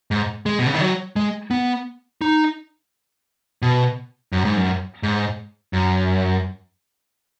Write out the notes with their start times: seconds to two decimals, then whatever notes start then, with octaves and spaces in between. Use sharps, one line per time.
0.11 G#2
0.46 G#3
0.59 B2
0.66 C#3
0.74 D#3
0.81 F#3
1.16 G#3
1.51 B3
2.21 D#4
3.62 B2
4.32 F#2
4.45 G#2
4.57 F#2
5.03 G#2
5.73 F#2